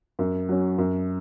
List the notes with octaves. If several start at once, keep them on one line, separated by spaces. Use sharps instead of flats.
F#2
F#3 C#4
F#2